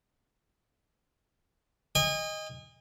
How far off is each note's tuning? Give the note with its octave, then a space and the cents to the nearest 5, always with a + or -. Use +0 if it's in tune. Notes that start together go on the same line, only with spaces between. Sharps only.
D#5 +0 G#5 -40